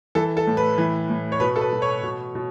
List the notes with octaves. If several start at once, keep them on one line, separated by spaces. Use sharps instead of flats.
E3 A4
A4
A2
B4
E3
A2
C#5
B2 B4
A4
B4
B2
C#5
B2
B2